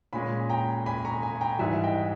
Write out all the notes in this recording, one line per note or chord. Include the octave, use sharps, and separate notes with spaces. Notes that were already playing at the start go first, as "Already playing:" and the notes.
A#2 G#3 C#4 G#5 B5
G5 A#5
G#5 B5
A#5 C#6
G#5 B5
G5 A#5
G#2 E3 G3 E5 G#5
D#5 G5